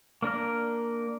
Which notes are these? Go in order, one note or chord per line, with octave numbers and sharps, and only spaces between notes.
A#3 D4 A#4 F6